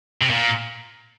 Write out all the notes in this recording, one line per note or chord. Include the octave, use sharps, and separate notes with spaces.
C3
A#2